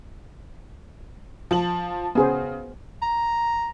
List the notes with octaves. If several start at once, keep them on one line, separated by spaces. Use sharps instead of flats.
F3 A5 F#7
C#3 B3 G#4 C5
A#5